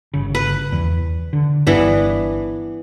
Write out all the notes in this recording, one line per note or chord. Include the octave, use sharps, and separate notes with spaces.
G1 C#3
B4
E2 E3
D3
G1 G2 E3 B3 D4